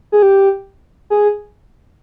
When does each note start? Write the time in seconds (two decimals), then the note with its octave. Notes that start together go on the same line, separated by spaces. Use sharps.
0.12 G#4
0.22 G4
1.10 G#4